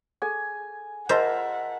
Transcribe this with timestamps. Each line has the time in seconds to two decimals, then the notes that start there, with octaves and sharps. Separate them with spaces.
0.22 G#4 A4 G#5
1.09 F4 G#4 A#4 C5 D#5 E5 F#5 A5